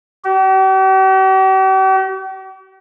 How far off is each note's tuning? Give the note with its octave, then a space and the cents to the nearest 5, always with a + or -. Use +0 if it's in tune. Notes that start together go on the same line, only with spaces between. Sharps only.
G4 -45